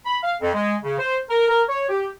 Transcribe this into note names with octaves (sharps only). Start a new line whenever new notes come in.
B5
F5
F2
G#3
C#3
C5
A#4
A#4
C#5
G4